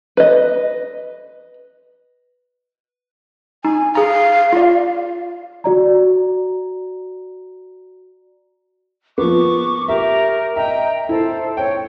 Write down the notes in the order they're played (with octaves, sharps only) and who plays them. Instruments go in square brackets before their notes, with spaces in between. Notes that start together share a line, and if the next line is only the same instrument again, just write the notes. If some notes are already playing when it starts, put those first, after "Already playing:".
[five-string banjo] B4 D#5
[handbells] D#4 [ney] G#5
[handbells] G#4 A#5 [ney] F5
[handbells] F4 D5
[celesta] F#4 D5 A#5
[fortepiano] F3 B3 [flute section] C#6 D6
[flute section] G4 A#4 [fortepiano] E5
[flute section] D#5 G5 A#5 [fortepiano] E5
[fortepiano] E4 [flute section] A4 C5
[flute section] C#5 [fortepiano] G5